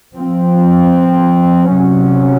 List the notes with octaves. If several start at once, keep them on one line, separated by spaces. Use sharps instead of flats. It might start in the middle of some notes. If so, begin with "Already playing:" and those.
F3 C4
C3 F#3 C#4